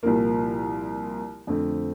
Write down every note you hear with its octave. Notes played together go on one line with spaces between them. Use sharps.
C2 A#2 F3 A#3
F2 D3 A3 C4